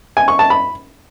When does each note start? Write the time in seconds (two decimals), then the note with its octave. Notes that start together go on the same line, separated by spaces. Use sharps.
0.17 G#5
0.28 C#6
0.39 A5
0.50 B5